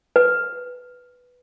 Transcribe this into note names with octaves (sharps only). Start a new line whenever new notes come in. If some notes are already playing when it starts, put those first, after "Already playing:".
B4